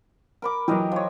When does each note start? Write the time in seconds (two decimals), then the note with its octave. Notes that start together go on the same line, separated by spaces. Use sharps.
0.42 A#4 B5 D6
0.68 E3 F#3 G4 A#4 D#5
0.92 F3 C#5